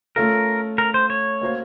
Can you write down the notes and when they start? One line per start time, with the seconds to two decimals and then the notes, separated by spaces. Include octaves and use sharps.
0.16 A3 C#4 F4 A4 A#4
0.78 A#4
0.94 C5
1.10 C#5
1.41 A#3 C#4 F#4 C5 F5